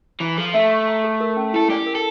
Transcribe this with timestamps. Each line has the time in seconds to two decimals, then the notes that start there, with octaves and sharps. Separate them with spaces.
0.20 E3 A#5
0.37 F3 A4
0.54 A3 E5
0.70 C#6
0.88 A#5
1.04 A4
1.20 A#4
1.37 C#4
1.53 E4 A4
1.70 G4 D5
1.87 A#4
1.95 A4